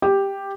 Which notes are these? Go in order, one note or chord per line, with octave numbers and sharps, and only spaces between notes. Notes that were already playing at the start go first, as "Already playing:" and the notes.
G4